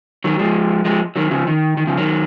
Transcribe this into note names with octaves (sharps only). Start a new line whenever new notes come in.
D#3 F#3
F3 G#3
F3 G#3
D#3 F#3
C#3 F3
D#3
D#3
C#3 F3
D#3 F#3